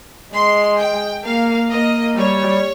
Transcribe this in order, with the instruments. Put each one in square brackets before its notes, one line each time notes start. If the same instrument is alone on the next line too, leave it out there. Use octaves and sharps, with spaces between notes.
[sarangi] G#3 [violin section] C6
[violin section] G5
[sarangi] A#3 [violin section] F5
[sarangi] A#3 [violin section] D#5
[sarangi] G3 [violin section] C#5